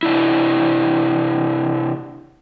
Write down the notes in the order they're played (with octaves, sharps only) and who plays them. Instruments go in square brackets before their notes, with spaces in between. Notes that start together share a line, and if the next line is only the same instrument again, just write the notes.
[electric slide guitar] C3 D4 E4